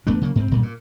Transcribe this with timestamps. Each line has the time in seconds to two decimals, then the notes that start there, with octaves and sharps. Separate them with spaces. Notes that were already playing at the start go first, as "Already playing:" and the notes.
0.07 E2 A3 B3 D4
0.21 C#3 F#3 A#3
0.36 G#2 C4
0.51 G1 A#2 G3
0.63 A#2